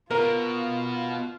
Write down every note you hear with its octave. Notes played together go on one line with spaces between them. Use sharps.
B2 F4 A#4 F5